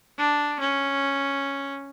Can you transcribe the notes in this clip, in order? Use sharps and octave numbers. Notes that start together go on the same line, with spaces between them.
D4
C#4